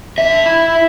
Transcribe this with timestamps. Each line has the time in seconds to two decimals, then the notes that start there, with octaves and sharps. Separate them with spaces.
0.18 D3 E5
0.46 E4